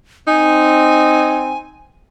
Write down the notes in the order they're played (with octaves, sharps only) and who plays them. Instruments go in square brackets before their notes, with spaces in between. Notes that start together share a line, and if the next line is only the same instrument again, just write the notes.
[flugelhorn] C4 [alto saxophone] D#4 [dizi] G#5